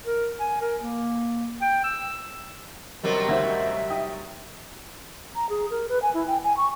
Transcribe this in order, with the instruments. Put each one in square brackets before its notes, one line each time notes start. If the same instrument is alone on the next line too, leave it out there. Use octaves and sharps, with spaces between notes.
[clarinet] A#4
G#5
A#4
A#3
G5
E6
[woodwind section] F#2 D#3 [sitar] C3 F#3 G3
[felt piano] D2 D#4 C5 [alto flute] E5
[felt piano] D#4 G5 D#6
[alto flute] A#5
G#4
A#4
B4
G#5
E4
G5
G#5
C#6